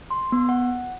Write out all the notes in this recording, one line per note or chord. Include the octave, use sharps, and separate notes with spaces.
C6
B3
F#5